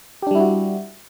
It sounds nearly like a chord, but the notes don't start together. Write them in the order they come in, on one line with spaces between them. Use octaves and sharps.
G4 D4 G3 E4 F#4